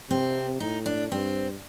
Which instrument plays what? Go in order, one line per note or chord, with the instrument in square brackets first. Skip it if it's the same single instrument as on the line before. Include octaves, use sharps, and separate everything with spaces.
[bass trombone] C3 [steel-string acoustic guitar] C4
[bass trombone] A2 [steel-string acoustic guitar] D#4
[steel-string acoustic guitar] D4
[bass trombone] G2 [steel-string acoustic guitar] C4